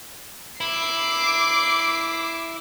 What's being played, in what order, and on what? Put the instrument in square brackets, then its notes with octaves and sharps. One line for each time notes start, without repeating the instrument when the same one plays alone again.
[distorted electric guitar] E4 [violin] D6 C7